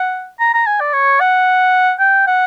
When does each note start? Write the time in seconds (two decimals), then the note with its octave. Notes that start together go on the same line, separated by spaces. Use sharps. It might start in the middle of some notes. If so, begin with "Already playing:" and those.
Already playing: F#5
0.40 A#5
0.54 A#5
0.67 G#5
0.80 D5
0.93 C#5
1.20 F#5
1.99 G5
2.27 F#5